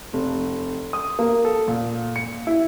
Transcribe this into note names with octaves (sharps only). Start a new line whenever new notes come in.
F1
D#6
A#3
A4
A#2
C#7
E4